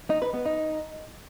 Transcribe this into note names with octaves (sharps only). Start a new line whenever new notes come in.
D#4
B4
B3
D#4